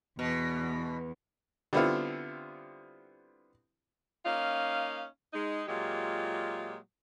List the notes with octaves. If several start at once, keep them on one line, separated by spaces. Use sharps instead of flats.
E2 B2
D3 G3 B3 C4 E4 F4
A#3 C#4 D#4 F5
G#3 D#4
A#2 F#3 G#3 F4 G4